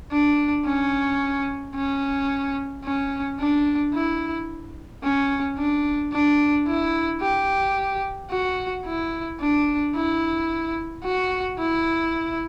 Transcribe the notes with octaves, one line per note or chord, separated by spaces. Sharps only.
D4
C#4
C#4
C#4
D4
E4
C#4
D4
D4
E4
G4
F#4
E4
D4
E4
F#4
E4